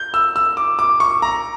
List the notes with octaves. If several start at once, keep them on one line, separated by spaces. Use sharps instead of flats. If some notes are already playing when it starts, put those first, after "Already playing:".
Already playing: G6
E6
E6
D6
D6
C#6
A#5